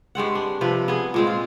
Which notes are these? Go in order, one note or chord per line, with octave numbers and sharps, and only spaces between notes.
G2 G#3 C4 F#5
D4
C3 F3 B4
B3 G#4
A#2 G#3 C4
F4